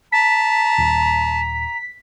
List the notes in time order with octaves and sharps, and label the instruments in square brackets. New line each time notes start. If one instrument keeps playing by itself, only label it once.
[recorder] A5 [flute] A#5 [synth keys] B6
[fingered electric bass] D#1